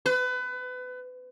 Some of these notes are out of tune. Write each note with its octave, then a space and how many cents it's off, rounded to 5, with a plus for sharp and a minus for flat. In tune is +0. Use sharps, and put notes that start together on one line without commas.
B4 +30